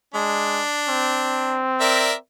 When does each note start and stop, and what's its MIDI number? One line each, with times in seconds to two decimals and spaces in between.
0.14 0.63 56
0.14 1.60 62
0.88 2.18 60
1.80 2.13 70
1.80 2.13 74
1.80 2.13 76